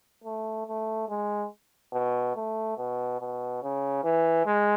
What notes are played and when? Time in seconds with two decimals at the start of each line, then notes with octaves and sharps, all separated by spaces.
0.24 A3
0.67 A3
1.09 G#3
1.93 B2
2.36 A3
2.77 B2
3.20 B2
3.62 C#3
4.04 E3
4.46 G#3